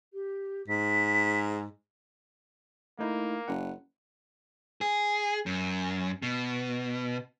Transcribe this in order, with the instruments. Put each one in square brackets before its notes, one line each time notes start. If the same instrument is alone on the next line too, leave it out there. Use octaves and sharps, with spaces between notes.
[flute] G4
[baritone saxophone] G#2 [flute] B6
[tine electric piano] A3 D#4 E4 [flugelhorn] A#3
[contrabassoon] F#1 [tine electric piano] F#5
[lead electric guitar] G#4
F#2
B2